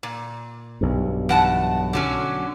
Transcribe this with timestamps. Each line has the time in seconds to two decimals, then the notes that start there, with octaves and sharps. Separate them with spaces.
0.03 A#2
0.81 B1 G2
1.29 E2 F#5 A5
1.93 D3 F#3 C#4